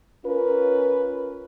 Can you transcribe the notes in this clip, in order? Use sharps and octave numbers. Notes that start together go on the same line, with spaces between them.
C#4 F4 A#4 B4